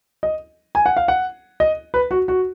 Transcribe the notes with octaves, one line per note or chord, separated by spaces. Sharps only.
D#5
G#5
F#5
F5
F#5
D#5
B4
F#4
F#4